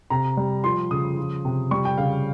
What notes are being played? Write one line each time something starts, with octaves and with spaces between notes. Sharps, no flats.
C3 A#5
G3
F3 C6
C#3 D#6
F3
C3
G3 C#6
G5
C#3 F5